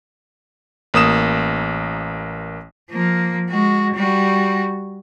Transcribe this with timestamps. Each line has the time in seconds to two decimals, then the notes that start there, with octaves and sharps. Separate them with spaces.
0.94 A1 A#3 D#6 E7
2.91 F3 A#3
3.50 G#3 F#4
3.95 G3 F#4